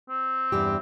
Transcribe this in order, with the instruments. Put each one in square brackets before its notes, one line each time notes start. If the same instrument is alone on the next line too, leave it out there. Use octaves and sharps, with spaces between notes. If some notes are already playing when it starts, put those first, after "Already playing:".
[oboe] C4
[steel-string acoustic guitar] E2 G2 G4